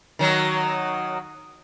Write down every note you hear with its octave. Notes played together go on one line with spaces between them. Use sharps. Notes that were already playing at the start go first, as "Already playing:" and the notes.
D#3 F#3